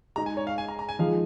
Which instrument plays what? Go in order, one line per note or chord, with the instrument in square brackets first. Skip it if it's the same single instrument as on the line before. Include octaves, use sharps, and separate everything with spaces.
[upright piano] G#3 D#4 G#4 [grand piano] A#5
[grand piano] G#5
C#5
F5
G#5
A#5
A#5
G#5
[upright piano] F3 G#3 D#4 G#4 [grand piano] F5